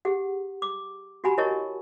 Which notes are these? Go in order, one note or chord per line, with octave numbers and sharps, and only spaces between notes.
G4 G#4 F#5
D6
F#4 G4 F#5 G#5 A#5 B5
E4 A#4 C#5 D#5 A5 C#6